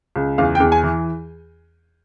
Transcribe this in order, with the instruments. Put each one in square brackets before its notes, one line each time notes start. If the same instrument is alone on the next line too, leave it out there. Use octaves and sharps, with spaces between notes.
[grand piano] C#2
E2 F5
G5
E2
G#5
E3